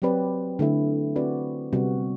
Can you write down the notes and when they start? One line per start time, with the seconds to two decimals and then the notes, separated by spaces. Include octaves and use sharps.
0.02 F#3 C4 G4 B4 D5
0.59 D3 A3 E4 A4
1.16 C4 F#4 B4 D5
1.73 C3 G3 B3 F#4